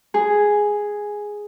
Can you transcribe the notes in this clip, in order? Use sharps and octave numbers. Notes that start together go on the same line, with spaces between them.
G#4